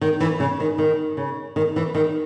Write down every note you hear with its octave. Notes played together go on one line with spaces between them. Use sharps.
D#3
E3
C#3
D#3
D#3
C#3
D#3
E3
D#3